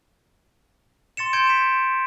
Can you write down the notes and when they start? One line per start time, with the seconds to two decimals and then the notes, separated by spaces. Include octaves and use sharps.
1.17 C6 A6 C#7 E7
1.33 C6 G6 G#6 D7
1.47 B6 E7